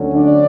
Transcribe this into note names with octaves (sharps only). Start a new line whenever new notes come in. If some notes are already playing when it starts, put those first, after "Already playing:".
Already playing: D2 D3 F#3 C#4
D4 D5